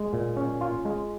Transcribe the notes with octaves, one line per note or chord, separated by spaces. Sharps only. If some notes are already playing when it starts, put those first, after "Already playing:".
Already playing: G#3
A#2
C#4
F4
G#3